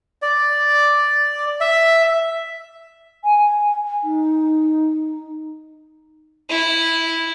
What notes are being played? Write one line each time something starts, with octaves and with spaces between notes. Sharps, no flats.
D5
E5
G#5
D#4
E4